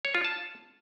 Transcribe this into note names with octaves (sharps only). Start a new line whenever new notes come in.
C#5
F4
A5